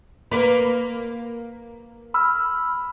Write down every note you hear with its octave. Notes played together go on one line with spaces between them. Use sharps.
A#3 B4
B5 E6 F6